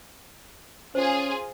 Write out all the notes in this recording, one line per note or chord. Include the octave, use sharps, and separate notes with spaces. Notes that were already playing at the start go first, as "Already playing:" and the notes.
C#4 F4 G#4 C5